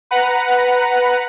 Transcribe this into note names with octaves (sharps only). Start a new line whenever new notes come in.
B4 F#5 A#5